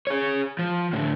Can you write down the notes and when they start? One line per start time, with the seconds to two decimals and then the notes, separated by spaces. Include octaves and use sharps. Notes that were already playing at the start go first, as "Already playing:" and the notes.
0.07 G#4 C#5
0.59 F3
0.93 A2 D3